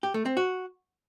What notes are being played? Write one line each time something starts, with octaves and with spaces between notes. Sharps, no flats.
G4
A3
C4
F#4